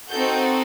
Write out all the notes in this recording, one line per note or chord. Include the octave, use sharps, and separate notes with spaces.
C4 D#4 F#4 A4 G6